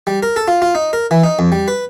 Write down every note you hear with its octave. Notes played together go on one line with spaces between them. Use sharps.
G3
A#4
A4
F4
F4
D#4
A#4
E3
D#4
F2
G3
B4